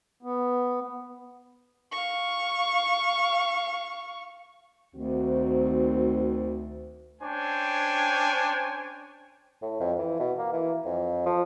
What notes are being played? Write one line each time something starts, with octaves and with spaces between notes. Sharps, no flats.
B3
F5 C#6
D2 D#3 C4 F#4
C#4 D4 C5 C#5 G5 G#5
A2
F2
E3
B2
A#3
E3
F2
F3